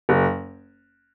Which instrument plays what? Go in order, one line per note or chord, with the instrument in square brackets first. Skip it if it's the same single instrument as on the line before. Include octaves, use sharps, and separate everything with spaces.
[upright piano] F#1